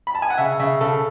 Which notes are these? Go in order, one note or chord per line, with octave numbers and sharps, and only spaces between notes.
B5
A5
G#5
F#5
C#3 E5
C#3 E5
C#3 A4